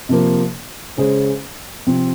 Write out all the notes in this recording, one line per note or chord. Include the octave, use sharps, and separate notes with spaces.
C3 F3 A#3
C#3 G#3 C#4 G#4 C5
C3 F3 C4